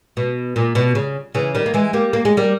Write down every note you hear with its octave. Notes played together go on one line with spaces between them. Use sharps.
B2
A#2
B2
C#3
C#3 E3
D#3 G3
A#3
E3 G#3
G3 A#3
A#3
G#3
G3 A#3